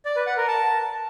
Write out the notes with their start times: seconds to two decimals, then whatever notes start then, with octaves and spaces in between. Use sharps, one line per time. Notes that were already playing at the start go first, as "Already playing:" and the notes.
0.05 D5
0.16 B4
0.27 F#5
0.37 A#4
0.48 A5